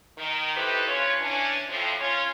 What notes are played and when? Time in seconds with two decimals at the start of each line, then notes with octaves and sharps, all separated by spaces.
0.17 D#3
0.55 D#4 E4 G4 A4 B4 C5
0.87 G2 C#4 F4 B4 C#5
1.22 E3 C#4 D4
1.69 F2 A2 F3
2.00 C#4 F4 C#5